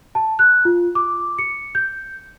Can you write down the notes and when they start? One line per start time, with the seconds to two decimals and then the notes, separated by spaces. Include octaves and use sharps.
0.15 A5
0.39 F#6
0.65 F4
0.95 D6
1.39 C#7
1.75 G6